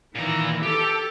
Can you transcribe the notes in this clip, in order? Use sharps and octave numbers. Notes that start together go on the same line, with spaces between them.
A#2 D#3 E3 A#5
G4 A4